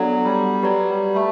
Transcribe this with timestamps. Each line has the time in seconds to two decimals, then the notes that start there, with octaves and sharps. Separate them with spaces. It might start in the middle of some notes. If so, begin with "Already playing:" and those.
Already playing: F#3 B3 D4 A4 D5 F#5
0.24 G3
0.63 F#3 G4 B4 D5
0.90 G3
1.15 A3